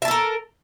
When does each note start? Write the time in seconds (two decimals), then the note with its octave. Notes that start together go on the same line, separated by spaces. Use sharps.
0.02 E5
0.05 A5
0.08 A4
0.11 A#4